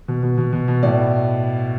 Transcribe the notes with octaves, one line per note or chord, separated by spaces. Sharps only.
B2
B2
B2
B2
B2
A2 D5